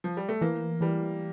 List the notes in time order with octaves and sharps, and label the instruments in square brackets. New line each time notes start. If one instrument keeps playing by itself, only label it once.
[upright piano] F3
G3
A3
[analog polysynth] E3 [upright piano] A#3
[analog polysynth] E3 [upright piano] G3